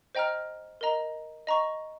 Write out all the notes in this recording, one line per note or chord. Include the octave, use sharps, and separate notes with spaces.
C5 D#5 G5 A#5 F6
A#4 D#5 A#5
D#5 A#5 C#6